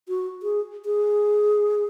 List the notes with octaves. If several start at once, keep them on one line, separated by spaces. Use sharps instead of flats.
F#4
G#4
G#4